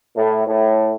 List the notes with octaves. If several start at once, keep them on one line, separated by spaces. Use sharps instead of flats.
A2
A2